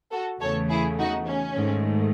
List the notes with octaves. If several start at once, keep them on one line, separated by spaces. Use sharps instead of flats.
F#4 A4
E2 C#3 E3 A3 A4 C#5
E4 G#4
D#4 F#4
C#4
G#2 D#3 A3